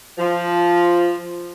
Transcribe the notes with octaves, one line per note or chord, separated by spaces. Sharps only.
F3